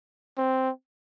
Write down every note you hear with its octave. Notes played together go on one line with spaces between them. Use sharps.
C4